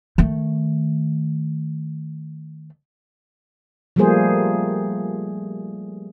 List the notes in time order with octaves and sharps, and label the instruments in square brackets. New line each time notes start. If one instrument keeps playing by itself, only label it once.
[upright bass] D#3 A3
[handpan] F3 G3 A3 A#3 G#4 C5